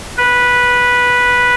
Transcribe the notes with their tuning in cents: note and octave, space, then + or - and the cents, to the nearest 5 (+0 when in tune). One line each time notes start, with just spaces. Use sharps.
B4 -10